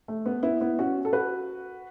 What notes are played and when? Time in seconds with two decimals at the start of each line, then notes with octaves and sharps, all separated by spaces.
0.08 A3
0.26 B3
0.43 B3 E4
0.61 B3 E4
0.79 C#4 F#4
1.05 A4
1.13 F#4 B4